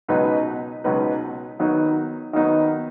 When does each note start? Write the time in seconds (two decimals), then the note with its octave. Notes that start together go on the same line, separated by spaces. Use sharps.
0.08 C#2 B2 F#3 D#4 B4
0.84 C#2 B2 F#3 D#4 B4
1.59 D#3 F#3 B3 D#4
2.33 D#3 F#3 B3 D#4